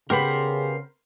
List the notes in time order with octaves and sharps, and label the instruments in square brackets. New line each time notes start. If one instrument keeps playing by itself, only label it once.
[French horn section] C#3 [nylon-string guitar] B3 G4 [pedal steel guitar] A#4 C5 B5